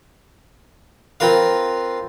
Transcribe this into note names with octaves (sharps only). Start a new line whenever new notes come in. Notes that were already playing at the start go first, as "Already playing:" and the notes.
C4 F4 A#4 B4 F5